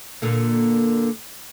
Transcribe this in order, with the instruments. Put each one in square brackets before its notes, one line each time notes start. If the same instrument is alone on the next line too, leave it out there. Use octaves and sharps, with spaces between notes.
[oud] A#2 D3 A#3